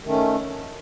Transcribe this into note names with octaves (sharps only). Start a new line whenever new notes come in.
D#3 A3 C#4